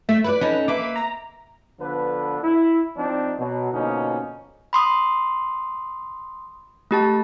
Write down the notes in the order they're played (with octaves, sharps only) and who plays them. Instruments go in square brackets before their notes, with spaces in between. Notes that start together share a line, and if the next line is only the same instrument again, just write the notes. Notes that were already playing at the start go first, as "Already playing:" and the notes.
[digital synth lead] A3 [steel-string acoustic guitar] E5
[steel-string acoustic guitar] E4 C#5 D5 [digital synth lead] B4
[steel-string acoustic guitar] C#4 D#4 A4
[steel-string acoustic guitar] A#3 B4 E5 [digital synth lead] D6
[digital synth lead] A#5
[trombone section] D3 F3 B3 D4 A4 B4
E4
F3 C4 D4 D#4
B2 F#3
B2 D3 F3 A#3 C#4 D#4
[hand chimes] B5 C6 D#6
A3 G4 A5